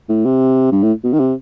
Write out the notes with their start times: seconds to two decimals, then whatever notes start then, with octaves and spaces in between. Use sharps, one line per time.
0.09 A2
0.25 C3
0.72 G2
0.83 A2
1.04 B2
1.13 D#3
1.20 C3